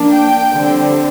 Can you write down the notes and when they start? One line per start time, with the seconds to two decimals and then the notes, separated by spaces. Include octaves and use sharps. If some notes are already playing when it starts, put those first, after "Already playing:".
Already playing: F3 A#3 D4
0.12 G5
0.52 D3 G3 C4